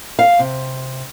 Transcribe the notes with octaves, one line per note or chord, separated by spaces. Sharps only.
F5
C3